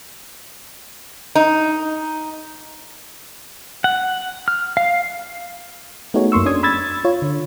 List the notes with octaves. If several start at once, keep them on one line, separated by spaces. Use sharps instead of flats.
D#4
F#5
F6
F5
A3 B3 D#4 F#4 G#4 C#5
F#2 A#3 C6 C#6 E6
C#4 D4 D#6 G#6
B5 E6 G#6 A6
F4 C#5
D3